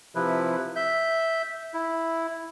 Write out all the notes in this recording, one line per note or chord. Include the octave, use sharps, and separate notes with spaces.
C3 F3 E4 B4
E5 G6
E4